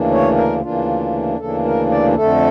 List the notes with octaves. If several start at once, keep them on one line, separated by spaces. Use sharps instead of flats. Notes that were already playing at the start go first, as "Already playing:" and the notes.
Already playing: D2 C#3 E3 A#3 D4
C#5
A#4
D2 C#3 E3 A#3 D4 F4
D2 C#3 E3 A#3 D4 A4
A#4
D5
F2 D3 A3 A4